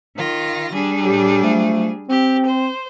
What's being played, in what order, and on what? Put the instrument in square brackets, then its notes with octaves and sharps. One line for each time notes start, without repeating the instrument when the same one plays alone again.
[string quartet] D#3 F4 A#6
G3 D4 G#4
[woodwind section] A2 G4
F3 F#3 A3
[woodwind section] C4 [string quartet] G4
[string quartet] C5